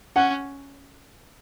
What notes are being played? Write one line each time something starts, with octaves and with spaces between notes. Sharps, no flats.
C#4 F#5